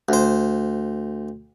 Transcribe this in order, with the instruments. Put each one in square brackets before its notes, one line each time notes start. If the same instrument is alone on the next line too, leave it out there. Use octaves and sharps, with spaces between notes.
[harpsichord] D2 C5